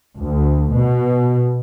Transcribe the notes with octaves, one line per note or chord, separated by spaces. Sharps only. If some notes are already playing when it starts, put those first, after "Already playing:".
D2
B2